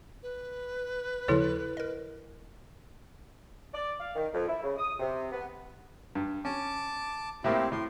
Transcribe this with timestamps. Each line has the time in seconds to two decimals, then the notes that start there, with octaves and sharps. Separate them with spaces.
0.23 B4
1.28 D#2 C#3 F3 E4 A4 C#5
1.77 A#4 D#5
3.73 D5
4.00 F5
4.15 D#3
4.33 F2
4.48 E4
4.62 C#3
4.77 D#6
4.99 C3
5.32 B3
6.15 G2
6.45 C#4 A5 D6
7.44 A2 A3 A#3 C4 E4 G4
7.72 A2 C6